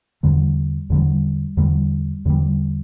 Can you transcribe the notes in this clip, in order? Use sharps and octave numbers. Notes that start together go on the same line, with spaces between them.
E2 D3 G3
E2 D3 G3
E2 D3 G3
E2 D3 G3